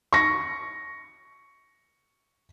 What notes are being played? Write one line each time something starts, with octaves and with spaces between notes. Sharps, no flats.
C#6 A#6